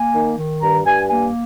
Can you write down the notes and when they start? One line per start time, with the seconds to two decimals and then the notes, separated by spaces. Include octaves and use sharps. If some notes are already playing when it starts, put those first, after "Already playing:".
Already playing: A#3 G#5
0.14 D#3
0.37 D#3
0.61 G2 A#5
0.85 G2 G#5
1.09 A#3 G#5